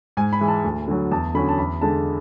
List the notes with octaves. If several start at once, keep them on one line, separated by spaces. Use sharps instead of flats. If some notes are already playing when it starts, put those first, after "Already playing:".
G#2 G#5
B5
E3 G#3
A5
D2
D3 F#3
E2 A5
D3 F#3 C#4 B5
A5
E2 B5
D3 G#3 A5